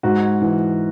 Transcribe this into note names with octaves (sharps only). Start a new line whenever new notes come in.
G#2 F#4
E3